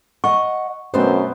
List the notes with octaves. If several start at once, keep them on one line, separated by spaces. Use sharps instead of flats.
D#5 F#5 C#6
F#2 B2 A3 B3 C4 C5